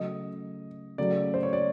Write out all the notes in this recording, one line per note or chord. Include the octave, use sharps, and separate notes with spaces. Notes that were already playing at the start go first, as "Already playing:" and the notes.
Already playing: C#3 F#3 A3 D#5
C#3 F#3 A3 D5
C5
C#5
D5